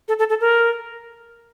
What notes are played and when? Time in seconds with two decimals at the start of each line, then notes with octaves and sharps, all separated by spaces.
0.08 A4
0.19 A4
0.29 A4
0.41 A#4